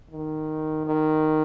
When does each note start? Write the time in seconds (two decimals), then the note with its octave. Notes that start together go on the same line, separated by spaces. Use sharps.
0.11 D#3
0.85 D#3